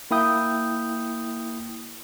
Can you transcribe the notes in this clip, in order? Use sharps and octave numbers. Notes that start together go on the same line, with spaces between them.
A#3 E4 G5 D#6 G6